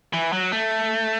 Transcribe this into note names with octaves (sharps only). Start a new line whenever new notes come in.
E3
F#3
A3